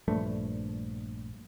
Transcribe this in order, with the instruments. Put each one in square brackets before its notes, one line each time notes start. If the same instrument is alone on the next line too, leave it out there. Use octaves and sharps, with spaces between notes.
[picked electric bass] A#1 G2 A3